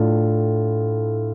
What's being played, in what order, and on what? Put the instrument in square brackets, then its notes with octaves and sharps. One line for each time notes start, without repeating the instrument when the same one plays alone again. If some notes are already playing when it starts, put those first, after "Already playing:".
Already playing: [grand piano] A2 A3 D4 F4